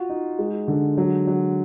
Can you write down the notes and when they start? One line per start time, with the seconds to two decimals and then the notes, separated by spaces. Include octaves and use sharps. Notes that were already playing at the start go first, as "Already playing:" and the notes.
Already playing: F4 F#4
0.09 D#4
0.39 G#3
0.68 D3
0.98 F#3
1.27 F#3